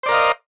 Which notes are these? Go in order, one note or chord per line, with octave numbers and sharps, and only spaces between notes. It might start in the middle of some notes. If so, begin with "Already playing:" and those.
A#4 C5 D5 D#5 F5